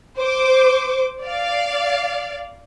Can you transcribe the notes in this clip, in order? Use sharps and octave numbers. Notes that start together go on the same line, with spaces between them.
C5 D6
D5 F5